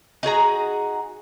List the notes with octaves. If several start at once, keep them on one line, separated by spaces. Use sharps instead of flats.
D#4 F#4 G#4 A#5